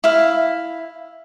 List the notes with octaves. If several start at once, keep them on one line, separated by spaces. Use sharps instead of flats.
E4 F5